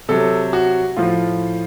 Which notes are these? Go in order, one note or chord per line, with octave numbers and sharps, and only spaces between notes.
C3 F#3 A4
F#4
A2 F3 F4